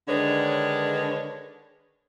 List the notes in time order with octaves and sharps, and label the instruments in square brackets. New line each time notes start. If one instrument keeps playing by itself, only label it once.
[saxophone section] D3 D#3 G#3 D4 B4 C#5